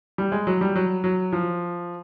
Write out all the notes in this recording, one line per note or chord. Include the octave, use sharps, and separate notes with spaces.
G3
G#3
F#3
G3
F#3
F#3
F3